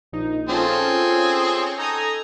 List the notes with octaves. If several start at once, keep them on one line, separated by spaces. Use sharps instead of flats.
A#1 D#4
C4 C#4 F4 G#4 A4
C#5
D#4 A4 G#5 A#5 D#6